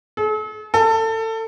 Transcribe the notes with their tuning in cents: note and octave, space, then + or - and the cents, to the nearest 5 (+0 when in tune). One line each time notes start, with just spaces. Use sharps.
A4 -45
A4 +25